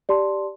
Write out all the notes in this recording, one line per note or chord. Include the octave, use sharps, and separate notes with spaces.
G4 D5 A5 C6